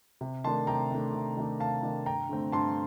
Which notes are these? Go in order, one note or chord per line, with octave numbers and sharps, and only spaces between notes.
C3
D#3 A3 D4 A5 C6
C3 G5 A#5
D#3 A3 D4
C3
D#3 A3 D4
C3 F5 A5
D#3 A3 D4
G2 G5 A#5
D3 A3 C4
G2 A5 C6